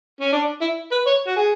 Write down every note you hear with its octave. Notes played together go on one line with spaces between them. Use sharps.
C#4
D4
E4
B4
C#5
F#4
G#4